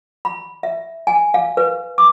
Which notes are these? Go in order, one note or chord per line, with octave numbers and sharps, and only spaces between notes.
B5
E5
G#5
F5
B4
D6